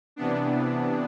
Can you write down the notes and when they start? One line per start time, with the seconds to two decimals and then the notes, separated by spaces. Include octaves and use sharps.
0.16 C3 E3 B3 D4